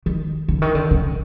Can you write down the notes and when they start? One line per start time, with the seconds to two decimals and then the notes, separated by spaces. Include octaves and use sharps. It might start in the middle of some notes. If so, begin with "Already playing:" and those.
0.06 D#3
0.48 D3
0.62 D#3
0.75 D3
0.91 C#3